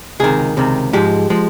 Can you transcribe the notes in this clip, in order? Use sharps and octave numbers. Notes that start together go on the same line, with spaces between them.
C#2 C3 D#3 G#4
C#2 C3 D#3
G#2 F3 G#3 G4
F3 G#3